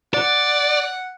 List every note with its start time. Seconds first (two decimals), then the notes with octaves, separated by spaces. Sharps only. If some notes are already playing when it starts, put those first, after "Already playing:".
0.14 D5 F#5